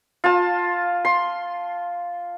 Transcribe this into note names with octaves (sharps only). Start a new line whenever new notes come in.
F4 A5
C6